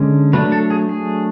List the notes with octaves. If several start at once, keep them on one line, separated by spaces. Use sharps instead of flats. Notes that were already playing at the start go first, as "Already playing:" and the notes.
Already playing: D3 G#3 C#4
F#3 A3 D4 B4
A4
G#4
G#4